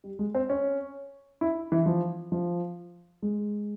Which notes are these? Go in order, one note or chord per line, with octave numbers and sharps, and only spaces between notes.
G3
G#3
C4
C#4
E4
E3
F3
F3
G#3